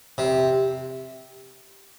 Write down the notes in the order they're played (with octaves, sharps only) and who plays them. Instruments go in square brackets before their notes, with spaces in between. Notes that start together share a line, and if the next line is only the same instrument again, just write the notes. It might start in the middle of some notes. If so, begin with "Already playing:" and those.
[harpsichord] C3